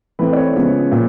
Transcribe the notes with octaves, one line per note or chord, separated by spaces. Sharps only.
E3 A3 C4 B4
D5
C#5
C#3 F3 G#3 B3
A#2 F3